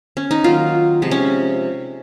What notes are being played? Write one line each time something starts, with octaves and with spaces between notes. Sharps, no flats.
C#4
D#4
D#3 F#3 A#3 F4
C3 F3 G#3
C#4